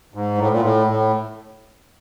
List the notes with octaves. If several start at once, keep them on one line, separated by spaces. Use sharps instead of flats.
G#2
A2
A#2
A2
A2